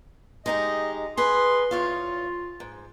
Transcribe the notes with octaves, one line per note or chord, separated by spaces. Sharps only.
G#3 D#4 G4 D#5
G#4 B4 C6
E2 F4 C#5 F5
G#2